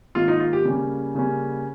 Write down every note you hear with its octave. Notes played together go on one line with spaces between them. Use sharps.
G#2 D#3 A#3 F4
D#4
F4
G4
C#3 G3 A#3 C#4
C#3 G3 A#3 C#4